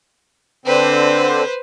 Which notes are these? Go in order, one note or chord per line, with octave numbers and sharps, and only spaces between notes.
D3 C4 B4 C5